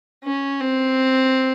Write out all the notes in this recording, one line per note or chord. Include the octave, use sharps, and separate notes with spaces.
C#4
C4